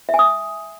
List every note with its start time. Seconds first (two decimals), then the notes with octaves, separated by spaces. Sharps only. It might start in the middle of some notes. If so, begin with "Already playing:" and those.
0.09 E5
0.14 G#5
0.19 D#6